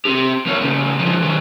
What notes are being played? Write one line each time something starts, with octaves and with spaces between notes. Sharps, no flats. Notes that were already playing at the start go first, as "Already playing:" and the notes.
C4 G4
A#3 C#5
A2 C#3
D3 F3
D#3 F#3